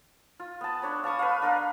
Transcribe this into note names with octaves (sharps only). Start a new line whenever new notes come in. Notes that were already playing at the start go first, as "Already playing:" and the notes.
F4
B3 A5
D4 C#5 B5
F5 A5 C#6 D#6
B4 F5
D4 A#4 F5